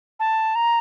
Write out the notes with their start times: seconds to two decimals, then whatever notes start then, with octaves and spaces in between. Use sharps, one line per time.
0.20 A5
0.55 A#5